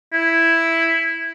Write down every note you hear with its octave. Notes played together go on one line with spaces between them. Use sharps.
E4